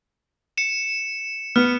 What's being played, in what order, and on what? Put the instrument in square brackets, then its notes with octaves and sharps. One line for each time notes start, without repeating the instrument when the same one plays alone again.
[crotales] C#7 E7
[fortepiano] B3 [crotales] F6